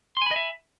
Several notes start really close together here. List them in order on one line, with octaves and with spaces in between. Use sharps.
C6 G#5 B5 D#5 E5